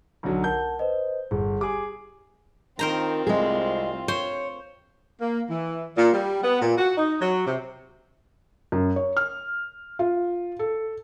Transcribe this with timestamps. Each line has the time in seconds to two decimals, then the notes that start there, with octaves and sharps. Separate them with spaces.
0.23 B1 D3 F#3
0.44 A#4 F#5 A5 G6
0.79 B4 C5 D#5
1.31 G1 G#4
1.61 G4 G#4 D6
2.79 D#3 C4 F4 A#4 C5 A#5
3.27 C2 G#3 G#4
4.08 C5 C#5
5.21 A#3
5.50 E3
5.97 A#2
6.13 G3
6.43 B3
6.61 A#2
6.78 F#4
6.97 D#4
7.21 F#3
7.46 C3
8.72 F#2
8.96 C#5
9.17 F6
9.99 F4
10.59 A4